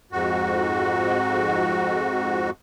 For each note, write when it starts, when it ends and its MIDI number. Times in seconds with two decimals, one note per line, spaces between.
0.12 2.50 41
0.12 2.50 44
0.12 2.50 66